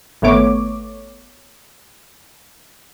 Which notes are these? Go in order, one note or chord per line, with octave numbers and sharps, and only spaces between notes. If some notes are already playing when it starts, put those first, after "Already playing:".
G#1 A3 B3 C#5 D6